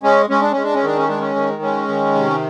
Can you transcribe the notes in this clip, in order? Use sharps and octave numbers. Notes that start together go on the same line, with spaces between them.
G#3 C#4
G#3 C#4
D4
G#3 C#4
D4
C#4
D#3 D4
C#4
G#3 D4
C#4
D#3
G#3 C#4
D#3
C3